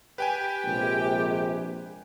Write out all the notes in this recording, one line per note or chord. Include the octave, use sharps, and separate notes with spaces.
G4 B4 G5 G#5
A#1 C3 G#3